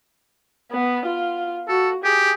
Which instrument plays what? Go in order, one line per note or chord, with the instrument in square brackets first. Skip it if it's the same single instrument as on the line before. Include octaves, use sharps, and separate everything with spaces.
[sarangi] B3
F4
[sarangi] F#4 [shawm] A4
[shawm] G4 [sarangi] G#4